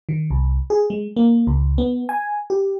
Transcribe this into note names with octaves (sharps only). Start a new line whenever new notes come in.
D#3
C2
G#4
G#3
A#3
C#2
B3
G#5
G4